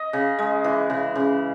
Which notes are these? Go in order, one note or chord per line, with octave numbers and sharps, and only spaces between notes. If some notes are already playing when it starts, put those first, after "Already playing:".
Already playing: D#5
C#3
G#3
E3
C#3
C#3